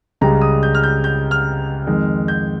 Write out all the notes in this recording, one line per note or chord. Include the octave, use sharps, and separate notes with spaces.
C#2 C#3 G3 A#5
D#6
G6
F6
G6
G6
F6
F2 D#3 G#3
G6